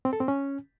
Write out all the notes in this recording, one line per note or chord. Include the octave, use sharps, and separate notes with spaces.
C4
A4
C4
C#4